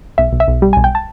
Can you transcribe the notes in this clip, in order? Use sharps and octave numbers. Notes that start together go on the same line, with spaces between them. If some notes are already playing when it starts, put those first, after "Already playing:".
B1 E5
B1
E5
B1
G3
G#5
B1
G5
A5